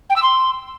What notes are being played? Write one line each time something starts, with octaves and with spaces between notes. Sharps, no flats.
G5
E6
C6